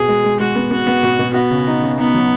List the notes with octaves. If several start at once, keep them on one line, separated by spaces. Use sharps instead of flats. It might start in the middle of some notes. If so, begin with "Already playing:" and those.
Already playing: B2 G#4
G#3
G#3
G#3 F#4
B3
B3 F#4
B3
B2
B2
B3 F#4
C#3
D#4
C#3
B3 D#4
F#3